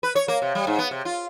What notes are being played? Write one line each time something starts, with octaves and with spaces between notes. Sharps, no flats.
B4
C#5
A#3
C3
G3
G#2
B3
C3
F4